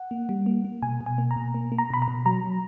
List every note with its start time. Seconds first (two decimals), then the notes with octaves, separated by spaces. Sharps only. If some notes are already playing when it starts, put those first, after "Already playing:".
Already playing: F#5
0.11 A#3
0.29 G3
0.46 A#3
0.64 A#3
0.82 B2 G#5
1.01 B2
1.06 G#5
1.18 A#3
1.31 A#5
1.36 B2
1.54 A#3
1.72 A#3
1.78 A#5
1.90 B2 B5
2.02 A#5
2.08 B2
2.26 F#3 A#5
2.44 F#3